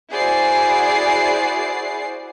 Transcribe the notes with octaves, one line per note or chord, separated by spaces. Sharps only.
E4 F#4 G#4 C5 D5 C7